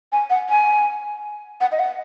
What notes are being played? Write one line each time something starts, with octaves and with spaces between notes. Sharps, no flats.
G#5
F#5
G#5
F#5
D#5
F#5